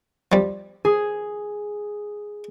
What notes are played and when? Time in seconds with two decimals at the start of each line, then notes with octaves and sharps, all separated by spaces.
0.32 F3 G3
0.85 G#4